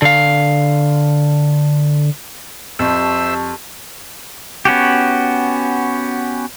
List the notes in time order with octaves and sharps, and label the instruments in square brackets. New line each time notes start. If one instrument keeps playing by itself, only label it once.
[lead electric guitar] D3 F5
[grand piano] F2 [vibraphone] G4 A5 C#6 [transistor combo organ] C5 E5 E6
[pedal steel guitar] B3 C#4 F#4 G4